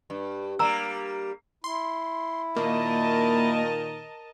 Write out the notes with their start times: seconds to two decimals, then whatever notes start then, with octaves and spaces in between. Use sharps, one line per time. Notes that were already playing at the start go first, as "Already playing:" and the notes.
0.10 G2
0.59 G3 A#3 A#5 E6
1.64 E4 C6
2.56 A#2 D#3 A#3 A#4 D#5 A5